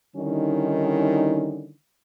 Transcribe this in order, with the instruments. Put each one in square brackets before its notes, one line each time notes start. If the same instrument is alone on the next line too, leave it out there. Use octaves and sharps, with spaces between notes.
[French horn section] D3 D#3 G3 C#4 D#4 E4